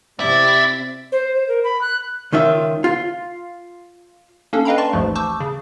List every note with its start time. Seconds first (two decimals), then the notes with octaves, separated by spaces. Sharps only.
0.20 C3 E4 D5
1.12 C5
1.35 C5
1.48 A#4
1.64 B5
1.81 F#6
2.32 C#2 D#3 F4 E5
2.84 F4
4.53 A#3 C#4 D4 A4
4.65 B4 D#5 F5 G5 A#5 B5
4.78 D5 A5 C6 C#6
4.93 A1 D#2 G#2 F3 A3
5.15 A5 C#6 D6 E6 G6
5.40 C#3